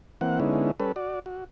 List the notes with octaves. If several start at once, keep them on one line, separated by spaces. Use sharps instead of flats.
E3 A#3 C4 F#5
D3 G#3 B3 C#4 D#4 E4
G3 C#4 A4 B4
F#4 D5
F#4